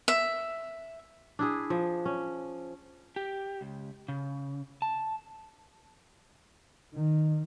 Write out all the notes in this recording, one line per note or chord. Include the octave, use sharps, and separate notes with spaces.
E5
D4 E4 G#4
F3
C#4
G4
C#2
C#3
A5
D#3